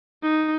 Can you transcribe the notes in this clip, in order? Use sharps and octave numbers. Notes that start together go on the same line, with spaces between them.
D#4